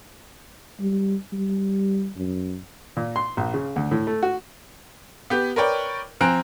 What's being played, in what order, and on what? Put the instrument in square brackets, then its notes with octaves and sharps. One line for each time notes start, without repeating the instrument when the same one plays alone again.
[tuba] G3
G3
F#2
[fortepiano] A#2
C6
A#1
C#3
D2
A2
A3
F#4
[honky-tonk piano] B3 G4
A#4 B4 C#5 D5 G5
F3 C4 G#5 A#5 F#6 D7